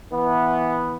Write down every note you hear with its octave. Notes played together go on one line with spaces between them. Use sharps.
E3 B3